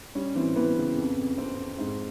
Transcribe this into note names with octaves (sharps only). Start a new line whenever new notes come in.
G3 C#4
E3 C4
E3 B3
C#3
F2
F2
F2 C4
F2
G#2 C4